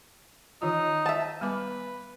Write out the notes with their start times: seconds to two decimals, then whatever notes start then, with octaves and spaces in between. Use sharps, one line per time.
0.62 D#3 E3 D#4 F4
1.06 E5 F5 A5
1.41 G3 B3 B4 D6